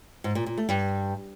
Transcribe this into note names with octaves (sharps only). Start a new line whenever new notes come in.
G#2
A#2
A#2
A3
G2